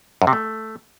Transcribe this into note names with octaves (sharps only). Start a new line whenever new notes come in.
F#2
C3
A3